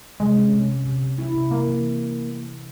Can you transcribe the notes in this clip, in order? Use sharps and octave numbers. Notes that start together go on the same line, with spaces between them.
C3 G#3
C#4
C3
C3
C3
C3
E4
C3
C3 A#3
E3